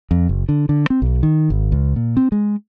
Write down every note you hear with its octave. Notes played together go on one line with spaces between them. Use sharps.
F2
F#1
D3
D3
C4
B1
D#3
G#1
C#2
A#2
C4
G#3